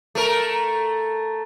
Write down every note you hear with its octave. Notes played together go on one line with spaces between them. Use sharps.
A3 A#4